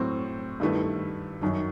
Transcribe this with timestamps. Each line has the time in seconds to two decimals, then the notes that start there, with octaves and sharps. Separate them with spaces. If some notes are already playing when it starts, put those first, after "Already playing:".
Already playing: A2 F#3 C4
0.60 G2 D#3 A3 E4 B4
1.41 F#2 D#3 F#3